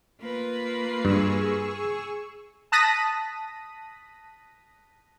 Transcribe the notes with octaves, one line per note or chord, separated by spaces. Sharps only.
A#3 F4 B4
G2 G#4 C#6 E6
A5 D#6 F#6 A#6 B6 D#7